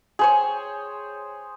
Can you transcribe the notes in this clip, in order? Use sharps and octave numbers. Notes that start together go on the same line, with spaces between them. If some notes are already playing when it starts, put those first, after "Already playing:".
G#4 C5 C#5